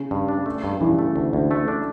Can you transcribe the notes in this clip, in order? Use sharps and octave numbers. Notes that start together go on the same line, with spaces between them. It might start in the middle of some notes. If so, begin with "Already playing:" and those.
Already playing: C#3
G2
D4
A3
G2
G2 C#3 E3
A3
D2
D2
A3
D4